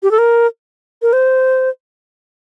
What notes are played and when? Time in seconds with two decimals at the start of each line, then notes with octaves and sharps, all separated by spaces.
0.03 G4
0.11 A4
0.18 A#4
1.02 A#4
1.13 C5